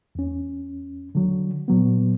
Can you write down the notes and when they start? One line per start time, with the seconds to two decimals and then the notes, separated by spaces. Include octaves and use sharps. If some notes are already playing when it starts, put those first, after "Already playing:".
0.15 E2 C#4
1.15 D3 F#3
1.68 A#2 F#3 B3